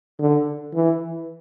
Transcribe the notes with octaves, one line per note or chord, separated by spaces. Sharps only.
D3
E3